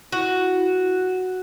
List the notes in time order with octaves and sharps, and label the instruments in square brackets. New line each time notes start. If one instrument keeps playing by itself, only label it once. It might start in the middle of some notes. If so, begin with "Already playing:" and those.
[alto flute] E4 [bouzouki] F#4